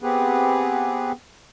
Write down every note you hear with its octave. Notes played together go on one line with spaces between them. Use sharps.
B3 C4 G4 G#4 B4